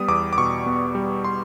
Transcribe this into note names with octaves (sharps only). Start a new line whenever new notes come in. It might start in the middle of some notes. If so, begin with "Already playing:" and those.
Already playing: G3 B3 D#6
E2 D6
D6
B2 C#6
B3
G3
C6